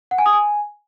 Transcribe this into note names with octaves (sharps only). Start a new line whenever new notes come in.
F#5
G#5
D#6
G#5